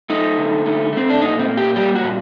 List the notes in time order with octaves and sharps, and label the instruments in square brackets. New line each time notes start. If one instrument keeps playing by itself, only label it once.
[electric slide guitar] A3 D#4
D3
A3
A3 C4
D4
A#2 D#4
C4
A#3
G4
G3 G4
F#4
A#2